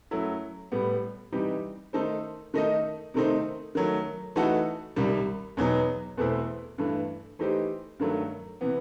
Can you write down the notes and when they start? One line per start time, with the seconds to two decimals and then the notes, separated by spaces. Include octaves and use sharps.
0.11 F#2 F#3 A3 E4
0.72 A2 G3 B3
1.32 C3 E3 G3 D#4 G4
1.93 D#3 A3 D#4 A4 C5
2.54 D#3 A3 D#4 A4 D#5
3.14 C3 D#3 A3 C4 D#4
3.75 D#3 F#3 A3
4.36 E3 A3 D#4 F#4 A4
4.96 C2 C3 D#3 G3
5.57 E2 B2 F#3 B3 D#4
6.17 E2 B2 A3 C4 E4
6.78 G2 E3 A3
7.39 E3 A3 D#4 G4 C5
8.00 G2 D#3 F#3 A3
8.61 C3 E3 B3